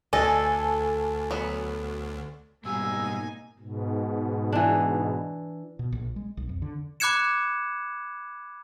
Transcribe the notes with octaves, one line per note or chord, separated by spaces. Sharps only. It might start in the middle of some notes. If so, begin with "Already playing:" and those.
D2 D4 A4 D#5 G#5
F#3 B3
G#2 B2 G3 A#3 D#4 G#5 E6
G#2 B2
E3 D4
B2
A#1
G#3
B1
F2
D3
B5 D6 F#6 G#6 C#7 E7